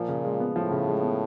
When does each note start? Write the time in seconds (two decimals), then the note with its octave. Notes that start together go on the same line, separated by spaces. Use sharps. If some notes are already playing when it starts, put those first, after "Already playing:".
Already playing: A#2 F3
0.08 C#3
0.25 G#3
0.40 B3
0.56 A2 F3
0.71 C#3
0.87 G#3
1.03 B3